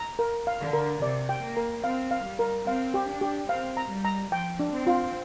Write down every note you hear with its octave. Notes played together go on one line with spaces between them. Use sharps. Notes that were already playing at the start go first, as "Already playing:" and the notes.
Already playing: A#5
A#4
F5
D3
A#4
C3 D5
G5
A#3
A#4
C4 F5
F5
G3
A#4
C4 F5
G4
D4
G4
C4 F5
A#5
G3
A#5
F3 G5
D4
C4
F4